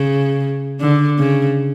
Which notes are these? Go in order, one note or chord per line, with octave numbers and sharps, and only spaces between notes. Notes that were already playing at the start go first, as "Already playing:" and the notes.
Already playing: C#3
D3
C#3